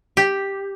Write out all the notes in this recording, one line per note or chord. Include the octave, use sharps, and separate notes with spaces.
G4